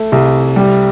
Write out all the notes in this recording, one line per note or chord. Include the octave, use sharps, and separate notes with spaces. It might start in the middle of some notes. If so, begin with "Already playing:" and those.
Already playing: A3
C2
G3